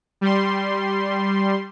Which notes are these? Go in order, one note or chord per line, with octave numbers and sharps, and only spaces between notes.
G3 C6